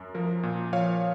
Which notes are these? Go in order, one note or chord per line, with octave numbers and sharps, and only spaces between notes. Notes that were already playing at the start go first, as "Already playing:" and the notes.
Already playing: F#2
F3 A#4
A#2
F3 C#5 F5